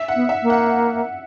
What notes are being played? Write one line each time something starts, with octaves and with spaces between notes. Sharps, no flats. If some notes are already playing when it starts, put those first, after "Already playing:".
Already playing: E5
F#5
B3
E5
A#3
F#5